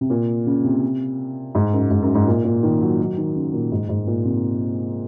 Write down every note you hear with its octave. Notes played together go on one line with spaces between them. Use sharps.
C3
A#2
C#3
C3
G#2
F#2
G#2
F#2
G#2
A#2
A#2
D#3
F#3
F#3
D#3
C#3
A#2
G#2
G#2
A#2
C3